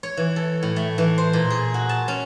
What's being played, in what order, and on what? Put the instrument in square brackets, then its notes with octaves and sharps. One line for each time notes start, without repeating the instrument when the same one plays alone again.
[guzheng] C#5
E3
A4
A2
A3
E3
C5
A#2
G#4
F#4
A5
C#4